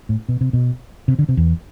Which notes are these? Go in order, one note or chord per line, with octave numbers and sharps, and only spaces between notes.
A2
B2
C3
B2
C3
D3
C3
E2